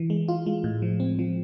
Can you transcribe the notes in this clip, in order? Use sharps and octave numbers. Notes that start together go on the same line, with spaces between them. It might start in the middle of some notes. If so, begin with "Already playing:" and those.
Already playing: E3
G#3
F4
G#3
A2
F3
C4
F3